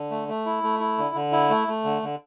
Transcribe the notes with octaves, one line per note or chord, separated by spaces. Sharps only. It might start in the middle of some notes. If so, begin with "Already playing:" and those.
Already playing: D3
A3
A3
E4
A3
E4
D3
D3
E4
A3
A3
D3
D3